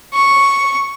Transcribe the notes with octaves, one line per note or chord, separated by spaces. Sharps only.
C#6